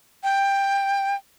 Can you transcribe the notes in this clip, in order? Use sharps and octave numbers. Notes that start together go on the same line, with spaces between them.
G5